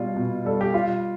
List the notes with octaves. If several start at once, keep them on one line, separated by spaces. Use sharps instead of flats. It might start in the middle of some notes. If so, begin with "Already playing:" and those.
Already playing: B2 G3 F4
B2
G3 A4
G4
G3 F4